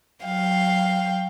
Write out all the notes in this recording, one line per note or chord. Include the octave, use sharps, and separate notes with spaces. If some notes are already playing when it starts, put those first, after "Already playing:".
F#3 F5 G5